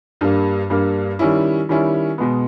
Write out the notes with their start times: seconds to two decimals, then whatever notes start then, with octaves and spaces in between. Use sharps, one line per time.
0.21 G2 G3 A#3
0.70 G2 G3 A#3
1.19 D#3 G3 C#4 E4
1.69 D#3 G3 C#4 E4
2.18 B2 G#3 B3